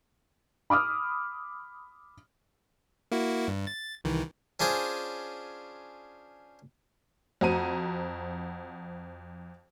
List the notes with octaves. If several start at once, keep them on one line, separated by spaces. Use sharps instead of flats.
B5 D6 D#6 F6
A#3 E4 F#4
G2
A6
C2 D#3 E3
C#4 D4 F4 G#4 C5
F2 F#4 C5 A#5 D#7